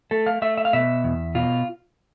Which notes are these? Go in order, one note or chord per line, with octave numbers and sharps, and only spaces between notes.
A3 A4
F5
A3 E5
E5
F5
B2 E5
E2
B2 F4